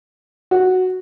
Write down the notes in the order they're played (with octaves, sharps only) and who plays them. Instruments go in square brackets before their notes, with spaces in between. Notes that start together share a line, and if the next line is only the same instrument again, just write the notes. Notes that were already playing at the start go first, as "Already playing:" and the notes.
[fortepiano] F#4